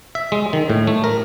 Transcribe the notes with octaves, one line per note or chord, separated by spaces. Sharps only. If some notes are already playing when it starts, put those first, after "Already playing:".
E5
G#3
D#3
A2
A3
A#4